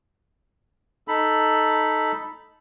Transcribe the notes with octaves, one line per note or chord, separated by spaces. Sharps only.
D#4 A4 B5